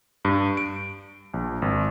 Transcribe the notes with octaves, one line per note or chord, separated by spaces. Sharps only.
G2
D7
A#1
G#1